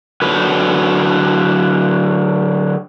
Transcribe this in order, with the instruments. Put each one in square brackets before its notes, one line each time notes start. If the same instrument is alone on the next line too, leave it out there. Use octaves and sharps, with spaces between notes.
[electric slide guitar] D3 F#3 B4